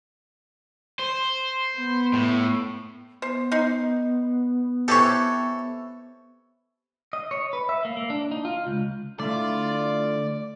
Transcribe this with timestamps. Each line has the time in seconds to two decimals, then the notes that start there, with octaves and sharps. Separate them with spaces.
0.99 C5
1.77 B3
2.13 A2
3.22 B3 C5
3.52 D#4 C6
4.88 E3 C4 G4 A4 C#5
7.13 D#5
7.31 C#5
7.53 B4
7.69 E5
7.85 A#3
7.97 A#3
8.10 D4
8.31 D#4
8.45 F4
8.67 C#2
9.20 D3 A3 E4 F4 D5